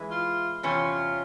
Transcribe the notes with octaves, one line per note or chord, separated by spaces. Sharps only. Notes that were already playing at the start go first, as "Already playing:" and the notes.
Already playing: E3 G#3 E4
F4
E2 C3 C#4 F4